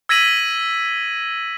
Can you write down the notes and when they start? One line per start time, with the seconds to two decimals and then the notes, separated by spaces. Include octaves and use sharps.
0.09 E6 G#6 A#6 B6 D#7 F#7